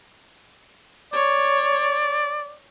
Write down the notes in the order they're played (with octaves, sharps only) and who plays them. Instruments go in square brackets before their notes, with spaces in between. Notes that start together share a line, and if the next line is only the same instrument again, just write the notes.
[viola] C#5 [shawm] D5